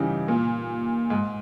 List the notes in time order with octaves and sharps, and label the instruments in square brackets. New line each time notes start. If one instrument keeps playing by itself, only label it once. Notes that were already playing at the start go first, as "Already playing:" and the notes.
Already playing: [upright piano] C#3 E3 G3 D#4
A#2
G#2